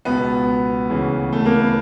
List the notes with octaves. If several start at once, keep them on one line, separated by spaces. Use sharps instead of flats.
C#2 B2 B3
D2 C#3 E3
A3
A#3
B3